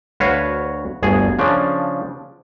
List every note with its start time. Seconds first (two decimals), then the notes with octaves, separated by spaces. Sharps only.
0.20 D2 F#4 B4 C#5 F5
1.03 G1 D2 G#4
1.39 C#3 F3 D4